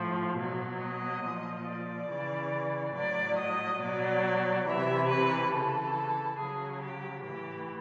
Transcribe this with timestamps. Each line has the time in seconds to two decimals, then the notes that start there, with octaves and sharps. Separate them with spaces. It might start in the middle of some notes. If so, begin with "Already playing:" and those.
Already playing: A2 F3
0.38 B2 F#3
0.82 D#5
1.25 A#2 F3
1.67 D5
2.10 C#3 E3
2.95 A2 F#3 D5
3.38 D#5
3.82 B2 F#3 D5
4.67 C3 E3 E5
5.10 B4
5.53 C#3 E3 A4
6.39 C#3 F#3 G#4
6.83 G4
7.24 A2 E3 G4